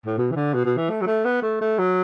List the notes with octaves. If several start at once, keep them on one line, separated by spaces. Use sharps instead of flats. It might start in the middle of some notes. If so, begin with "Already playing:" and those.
A2
B2
E3
D3
B2
B2
E3
A3
F#3
A3
B3
A3
A3
F#3